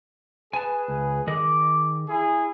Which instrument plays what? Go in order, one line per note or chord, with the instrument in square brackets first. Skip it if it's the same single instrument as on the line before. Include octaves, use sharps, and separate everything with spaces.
[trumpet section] G#4 B4 [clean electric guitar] G#5 A5
[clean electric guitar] C#2
[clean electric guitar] D#3 G#4 D#5 [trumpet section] D6
[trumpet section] E4 G#4